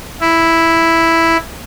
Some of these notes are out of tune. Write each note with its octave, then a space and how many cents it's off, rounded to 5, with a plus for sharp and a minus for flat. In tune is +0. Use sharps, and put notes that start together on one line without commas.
E4 +0